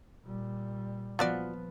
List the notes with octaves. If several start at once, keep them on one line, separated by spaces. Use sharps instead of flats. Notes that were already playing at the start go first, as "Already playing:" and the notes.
A#2 G3
F3 B3 F4 F#4 D5